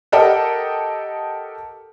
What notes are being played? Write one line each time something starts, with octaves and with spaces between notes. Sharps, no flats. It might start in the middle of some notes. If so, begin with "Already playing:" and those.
G4 A4 A#4 D#5 F#5 G5